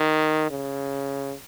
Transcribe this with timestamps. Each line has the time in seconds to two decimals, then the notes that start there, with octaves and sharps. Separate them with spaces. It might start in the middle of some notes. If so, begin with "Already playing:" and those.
Already playing: D#3
0.50 C#3